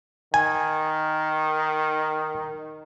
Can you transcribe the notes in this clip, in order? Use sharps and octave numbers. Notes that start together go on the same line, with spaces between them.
D#3 G#5